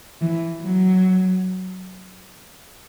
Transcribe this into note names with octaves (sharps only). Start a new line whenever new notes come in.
E3
F#3